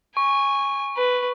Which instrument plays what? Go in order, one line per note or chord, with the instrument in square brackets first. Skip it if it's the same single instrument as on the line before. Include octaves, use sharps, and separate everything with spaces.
[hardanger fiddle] G#5 [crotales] C#6
[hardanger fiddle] B4